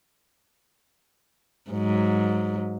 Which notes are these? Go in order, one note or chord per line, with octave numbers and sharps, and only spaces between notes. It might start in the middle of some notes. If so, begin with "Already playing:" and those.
G#2 F#3